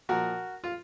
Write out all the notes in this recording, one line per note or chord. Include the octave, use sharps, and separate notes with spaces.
A#2 F3 F#4 A#4
F4